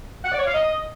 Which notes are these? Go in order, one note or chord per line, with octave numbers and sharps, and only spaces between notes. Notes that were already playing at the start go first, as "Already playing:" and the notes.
F#5
D5
C#5
F5
D#5